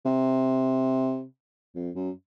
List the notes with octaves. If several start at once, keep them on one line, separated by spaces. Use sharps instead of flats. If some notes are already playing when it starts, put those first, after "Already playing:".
C3
F2
F#2